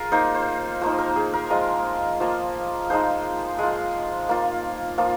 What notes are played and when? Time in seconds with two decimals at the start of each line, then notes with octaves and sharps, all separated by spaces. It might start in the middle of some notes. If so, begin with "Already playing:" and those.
Already playing: F4 G#4 A#4
0.12 A#3 D#4 C5
0.34 C5
0.81 F3 A#3 D#4 C5
0.98 A#4
1.16 G#4
1.33 A#4
1.50 F3 G#3 F4 D#5
2.20 F3 A#3 F4
2.90 F3 G#3 D#4 C5
3.59 G#3 F4
4.29 A#3 F4
4.98 F3 A#3 F4